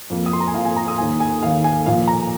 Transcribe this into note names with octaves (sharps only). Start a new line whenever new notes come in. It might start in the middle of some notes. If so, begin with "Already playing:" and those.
F2 F3 A#3
D#6
C6
A#5
G#5
F2 F3 A#3 F5
G#5
A#5
D#6
D#2 D#3 A#3 G#5
G#5
D#2 D#3 A#3 F5
G#5
A#2 F3 A#3 F5
A#5